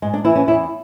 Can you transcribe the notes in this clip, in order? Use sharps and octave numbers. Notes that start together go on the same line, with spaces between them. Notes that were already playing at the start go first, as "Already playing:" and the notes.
G#2 G#3
D4
E3 E4
C#4
E2 E4